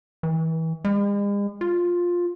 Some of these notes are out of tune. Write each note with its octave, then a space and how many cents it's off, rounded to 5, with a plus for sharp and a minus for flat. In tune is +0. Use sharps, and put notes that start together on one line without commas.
E3 -30
G#3 -45
F4 +10